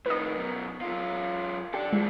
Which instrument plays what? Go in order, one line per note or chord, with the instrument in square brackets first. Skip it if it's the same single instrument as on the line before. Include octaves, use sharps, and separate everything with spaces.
[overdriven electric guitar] A2 D#3 [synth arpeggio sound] B4 D#5
[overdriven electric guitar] F#2 B2
F#2 F4
[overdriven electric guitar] D4 A4 [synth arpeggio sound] G4
[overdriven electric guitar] E3 F3 [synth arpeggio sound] G#3